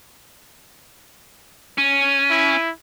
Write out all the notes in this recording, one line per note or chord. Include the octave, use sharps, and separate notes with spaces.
C#4 D#7
E4